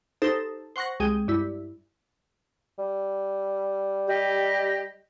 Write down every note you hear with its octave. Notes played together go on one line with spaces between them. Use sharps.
D#4 G4 A4 C5
C5 F#5 C#6 F#6 A#6
C2 G#3 G#4 G5 D#7
G2 E4
G3
G4 D#5